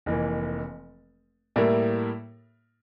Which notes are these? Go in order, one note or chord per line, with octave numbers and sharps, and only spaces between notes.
F1 F2 E3 A#3
A2 G3 A#3 E4 A#4